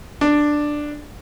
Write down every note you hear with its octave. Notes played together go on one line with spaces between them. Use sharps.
D4